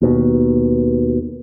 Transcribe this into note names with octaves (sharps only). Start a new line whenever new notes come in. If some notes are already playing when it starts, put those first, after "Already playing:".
D#2 B2